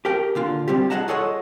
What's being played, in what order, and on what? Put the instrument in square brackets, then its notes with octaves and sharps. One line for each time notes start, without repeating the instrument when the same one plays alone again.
[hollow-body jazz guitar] G4 A#4 G5
A#2 D3 F4
G3 C4 F4 G4
G#4 C5 D#5 F#5 A5 A#5
F4 G#4 A4 C#5 D#5 F#5